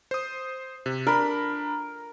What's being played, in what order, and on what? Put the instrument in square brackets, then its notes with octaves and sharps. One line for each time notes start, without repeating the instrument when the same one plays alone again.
[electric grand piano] C5 D#6
C3
[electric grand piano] D4 B5 [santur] A#4